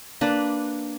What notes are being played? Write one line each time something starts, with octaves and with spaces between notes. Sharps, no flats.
A#3 D4 B4